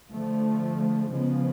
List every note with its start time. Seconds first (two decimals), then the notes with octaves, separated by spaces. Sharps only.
0.12 D3 F3 A3
1.12 C#3 F3 G#3 B3